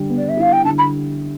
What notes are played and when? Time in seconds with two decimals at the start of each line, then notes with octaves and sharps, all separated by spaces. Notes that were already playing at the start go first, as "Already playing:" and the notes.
Already playing: D3 G3
0.10 B3
0.18 D5
0.29 E5
0.37 E4 F5
0.53 G5
0.64 D3 A5
0.78 B5